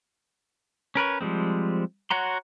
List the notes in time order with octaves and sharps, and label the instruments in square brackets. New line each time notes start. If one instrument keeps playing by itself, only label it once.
[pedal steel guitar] C#4 A#4 B4 C#5
F3 G3 G#3 C4
F#4 C#5 F#5 A#5 C6